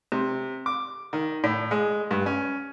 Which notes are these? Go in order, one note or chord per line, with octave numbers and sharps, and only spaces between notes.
C3
D6
D#3
A2
G#3
G2
C#4